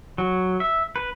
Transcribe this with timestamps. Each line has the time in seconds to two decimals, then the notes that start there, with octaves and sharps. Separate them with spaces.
0.18 F#3
0.60 E5
0.96 B4